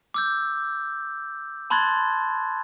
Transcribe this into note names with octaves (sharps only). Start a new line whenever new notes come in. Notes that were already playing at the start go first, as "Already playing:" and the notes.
D6 E6 G6
A5 B5 C6 F#6 G#6 A6